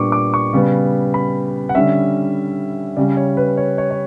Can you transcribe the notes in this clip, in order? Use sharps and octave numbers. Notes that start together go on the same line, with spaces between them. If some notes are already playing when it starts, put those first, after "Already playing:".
Already playing: A#2 G3 B3 D4 C#6 D6
D6
C#6
C#3 G3 B3
B5
F#5
D3 G3 C#4 E5
C#3 G3 C#4 D5
C#5
B4
C#5
C#5
C#5